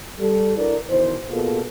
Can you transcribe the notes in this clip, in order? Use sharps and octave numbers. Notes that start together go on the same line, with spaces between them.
G3 A4
D4 E4 F#4 A#4 B4 D5
B2 D#3 E3 C5
B2 A#3 F4 G#4 A4